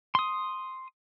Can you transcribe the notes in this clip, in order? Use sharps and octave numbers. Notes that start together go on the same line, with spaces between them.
C6 D#6